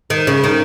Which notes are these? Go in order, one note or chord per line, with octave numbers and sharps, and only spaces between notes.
D#3
C#3
D#3